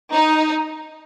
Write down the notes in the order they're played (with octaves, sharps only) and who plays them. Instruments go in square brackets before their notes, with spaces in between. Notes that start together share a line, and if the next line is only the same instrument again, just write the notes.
[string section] D#4